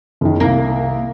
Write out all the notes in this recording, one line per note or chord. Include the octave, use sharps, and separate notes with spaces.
F#1 D#3
C2 A#3